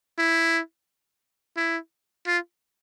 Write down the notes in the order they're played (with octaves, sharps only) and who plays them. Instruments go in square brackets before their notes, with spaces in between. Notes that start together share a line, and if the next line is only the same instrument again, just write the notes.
[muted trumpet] E4
E4
F4